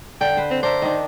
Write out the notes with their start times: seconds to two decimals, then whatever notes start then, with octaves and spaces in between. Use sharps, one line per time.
0.21 D3 G5
0.37 B4 C5
0.51 C4
0.63 D4 A#4 C5 E5
0.82 D#3 D4